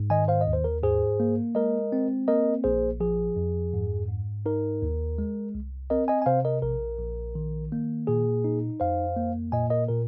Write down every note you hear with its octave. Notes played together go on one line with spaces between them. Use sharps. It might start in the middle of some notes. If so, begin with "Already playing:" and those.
Already playing: G#2
D#3 D#5 G#5
C5 F5
D#5
D#2
C5
A#4
G#2 G#4 C5
A#3
G#3 A#4 D#5
C4
A#3 A#4 D#5
A#1 G#4 C5
F3 G#4
F2
G#2
G#2
D#4 A#4
D#2
G#3
C2
C4 A#4 D#5
D#5 G#5
G#5
C3 C5 F5
A#4 D#5
A#1 A#4
A#1
D#3
A#3
A#2 G#4
D#4
F2 C5 F5
A#3
A#2 D#5 G#5
A#4 D#5
A#2 A#4